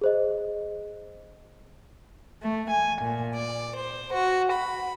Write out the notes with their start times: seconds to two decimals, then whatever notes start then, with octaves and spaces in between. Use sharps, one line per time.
0.01 G#4 C5 D#5
2.41 A3
2.70 G#5
3.02 A#2
3.35 D5
3.76 C5
4.13 F#4
4.52 B5